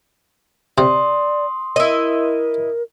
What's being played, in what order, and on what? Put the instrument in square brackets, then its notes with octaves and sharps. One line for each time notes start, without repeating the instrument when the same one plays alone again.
[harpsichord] C3 C5 [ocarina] D5 [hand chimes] C6 D#6
[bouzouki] E4 D#5 [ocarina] A#4